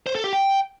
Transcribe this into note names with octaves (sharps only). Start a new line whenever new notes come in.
C5
A4
G4
G5